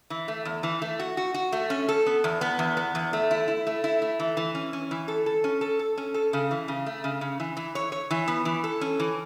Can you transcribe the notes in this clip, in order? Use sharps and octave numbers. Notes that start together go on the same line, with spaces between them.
E3
A3
E2
E3
A3
F#4
F#4
F#4
A3
C#4
A4
B3
E2
B3
E2
B3
E2
A3
E4
E4
A3
E4
A3
E3
E3
C#4
C#4
E3
A4
A4
C#4
A4
A4
C#4
A4
C#3
E3
C#3
A3
C#3
C#3
E3
E3
C#5
C#5
E3
B3
E3
A4
C#4
E3